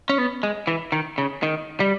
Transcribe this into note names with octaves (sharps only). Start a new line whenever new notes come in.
C#4
B3
G#3
E3
D#3
C#3
D#3
G3